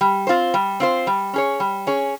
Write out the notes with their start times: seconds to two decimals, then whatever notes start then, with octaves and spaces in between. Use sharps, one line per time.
0.01 G3
0.27 C4 F4 C5
0.54 G3
0.80 C4 F4 C5
1.07 G3
1.33 C#4 G#4 C#5
1.60 G3
1.87 C#4 G#4 C#5